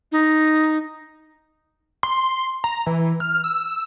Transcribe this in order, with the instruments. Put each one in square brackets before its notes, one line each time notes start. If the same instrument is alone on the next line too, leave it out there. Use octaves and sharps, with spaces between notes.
[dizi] D#4
[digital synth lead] C6
A#5
E3
F6
E6